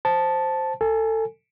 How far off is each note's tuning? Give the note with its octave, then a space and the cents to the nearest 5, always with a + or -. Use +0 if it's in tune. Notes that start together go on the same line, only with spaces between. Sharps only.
C5 +0 A5 -5
A4 +20 G#5 +0